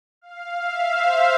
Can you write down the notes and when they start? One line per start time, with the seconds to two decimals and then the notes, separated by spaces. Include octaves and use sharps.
0.21 F5
0.58 E5
0.94 C5